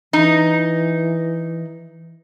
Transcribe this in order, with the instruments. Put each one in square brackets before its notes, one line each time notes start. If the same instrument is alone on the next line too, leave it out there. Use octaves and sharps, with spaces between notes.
[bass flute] E3 [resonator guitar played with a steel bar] D#4